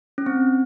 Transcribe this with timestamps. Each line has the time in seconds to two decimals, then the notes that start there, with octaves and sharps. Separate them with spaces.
0.18 C#4
0.26 C4